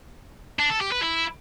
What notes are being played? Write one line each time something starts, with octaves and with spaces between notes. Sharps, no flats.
D4
A4
G4
B4
E4